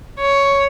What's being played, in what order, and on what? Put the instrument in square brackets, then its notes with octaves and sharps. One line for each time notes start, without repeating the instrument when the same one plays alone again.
[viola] C#5